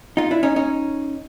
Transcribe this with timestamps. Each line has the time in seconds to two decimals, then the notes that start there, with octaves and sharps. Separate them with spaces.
0.17 D#4 F4
0.31 D4 E4
0.43 C#4 D#4
0.56 C#4 D#4